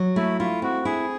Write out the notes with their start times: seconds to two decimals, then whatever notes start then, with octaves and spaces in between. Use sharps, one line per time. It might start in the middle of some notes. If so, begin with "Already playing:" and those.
Already playing: F#3
0.16 A3 E4
0.39 E4 F4
0.62 C4 F#4
0.85 E4 G#4